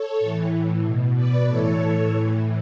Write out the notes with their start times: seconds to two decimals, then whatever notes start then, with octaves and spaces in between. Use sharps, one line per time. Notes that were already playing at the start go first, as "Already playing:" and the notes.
Already playing: A4 C#5
0.20 A2 E3
0.84 B2
1.15 B4 D5
1.46 A2 E3 A4 C#5
2.11 A2 E3